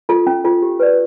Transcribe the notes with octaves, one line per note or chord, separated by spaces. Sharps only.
F4 A4
C#4
F4 A4
G4
B4 D5